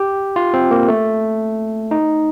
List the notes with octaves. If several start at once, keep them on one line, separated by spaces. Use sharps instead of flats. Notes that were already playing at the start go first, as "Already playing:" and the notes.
Already playing: G4
F4
C4
A#3
A3
D#4